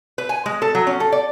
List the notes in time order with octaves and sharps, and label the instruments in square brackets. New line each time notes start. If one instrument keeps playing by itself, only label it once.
[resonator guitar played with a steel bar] B4
G#5
G#3
A4
F#3
C#4
A4
D5